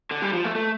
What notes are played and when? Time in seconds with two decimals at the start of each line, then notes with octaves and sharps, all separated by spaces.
0.11 D3
0.22 G3
0.33 F3
0.45 A3
0.56 A3